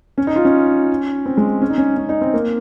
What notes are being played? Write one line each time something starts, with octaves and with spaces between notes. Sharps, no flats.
C#4
D#4
F4
C#4
C4
G#3
C#4
D#4
C#4
C#4
D#4
C4
A#3